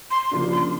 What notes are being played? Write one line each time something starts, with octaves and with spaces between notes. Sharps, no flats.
C6
C#3 F3 A#3 D4
C6